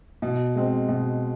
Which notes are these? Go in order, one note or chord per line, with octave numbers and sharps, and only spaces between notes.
B2
G#3 C4
B2